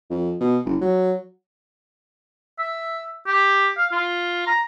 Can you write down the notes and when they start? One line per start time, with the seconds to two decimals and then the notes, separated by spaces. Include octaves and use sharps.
0.10 F2
0.40 B2
0.66 F#1
0.81 F#3
2.59 E5
3.27 G4
3.78 F5
3.92 F4
4.47 A#5